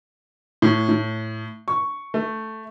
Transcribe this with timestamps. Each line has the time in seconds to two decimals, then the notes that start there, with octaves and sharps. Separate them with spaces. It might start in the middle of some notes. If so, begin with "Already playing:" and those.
0.62 A2
0.89 A2
1.68 C#6
2.14 A3